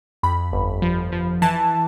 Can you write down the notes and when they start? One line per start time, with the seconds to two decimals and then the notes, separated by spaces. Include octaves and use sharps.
0.23 F2 B5
0.53 G1
0.82 F3
1.12 F3
1.42 E3 A5